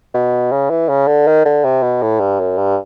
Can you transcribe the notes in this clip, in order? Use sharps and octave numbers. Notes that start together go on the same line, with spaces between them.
B2
C#3
E3
C#3
D3
D#3
D3
C3
B2
A2
G2
F#2
G2